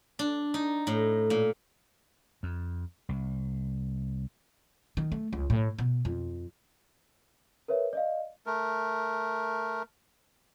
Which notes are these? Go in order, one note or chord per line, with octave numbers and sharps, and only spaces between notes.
D4
D#4
A2
A#2
F2
C2
D#3
A3
C#2
A2
B2
F2
A#4 B4 C#5 E5
D5 D#5 F5
A3 A#4